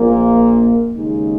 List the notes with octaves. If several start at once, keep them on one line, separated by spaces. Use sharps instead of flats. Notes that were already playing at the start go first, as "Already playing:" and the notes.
Already playing: A#1 A#2 A#3
D#2 C#3 G#3 D#4